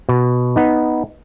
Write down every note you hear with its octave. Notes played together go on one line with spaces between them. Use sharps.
B2
B3 D#4